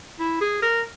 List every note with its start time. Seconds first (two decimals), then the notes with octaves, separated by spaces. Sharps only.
0.19 E4
0.41 G#4
0.62 A#4